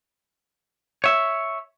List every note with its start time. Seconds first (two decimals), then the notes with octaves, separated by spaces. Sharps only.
1.04 C#5 E5